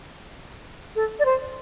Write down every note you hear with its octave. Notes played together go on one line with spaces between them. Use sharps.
A4
D5
C5